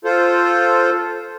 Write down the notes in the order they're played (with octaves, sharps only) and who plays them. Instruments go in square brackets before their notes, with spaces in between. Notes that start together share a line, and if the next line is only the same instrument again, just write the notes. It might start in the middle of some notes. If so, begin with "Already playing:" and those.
[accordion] F4 A4 C5